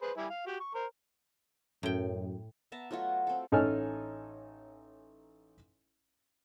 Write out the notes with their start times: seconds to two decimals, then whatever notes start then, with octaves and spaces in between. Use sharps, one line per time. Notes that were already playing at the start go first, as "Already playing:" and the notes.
0.02 G#4 B4 C5
0.17 G3 E4 G#5
0.30 F5
0.46 F#4 G4
0.60 C#6
0.75 A#4 C5
1.83 F#2 A2 G5
2.72 B3 E5 A5 A#5
2.91 F#3 A3 F4 F#4
3.27 C4 A4
3.52 A1 D#4 A4 C#5 G#5 F6